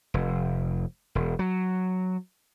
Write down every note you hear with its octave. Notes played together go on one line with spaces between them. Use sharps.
F1
E1
F#3